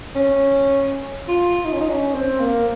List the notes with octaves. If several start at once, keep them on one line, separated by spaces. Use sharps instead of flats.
C#4
F4
D#4
C#4
D#4
C#4
C4
A#3